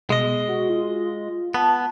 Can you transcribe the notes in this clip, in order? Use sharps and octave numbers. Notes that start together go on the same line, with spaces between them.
B2 G#3 D#5
F#4
F4
B3 A5